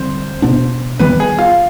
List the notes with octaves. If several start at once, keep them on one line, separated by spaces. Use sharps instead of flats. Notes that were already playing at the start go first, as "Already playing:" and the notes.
Already playing: D3 G3 C4 C5
B2 B3 D4
D#3 G3 B3 B4
G#4
F4